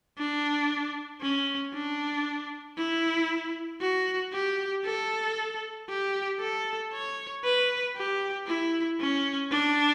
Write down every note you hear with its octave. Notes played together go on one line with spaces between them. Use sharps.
D4
C#4
D4
E4
F#4
G4
A4
G4
A4
C#5
B4
G4
E4
C#4
D4